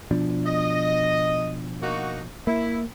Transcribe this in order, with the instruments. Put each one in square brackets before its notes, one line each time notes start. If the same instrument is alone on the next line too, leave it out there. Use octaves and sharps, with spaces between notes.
[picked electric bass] B2 F3 D4
[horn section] D#5
A#3 D#4 F#4
[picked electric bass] A#3 [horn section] E4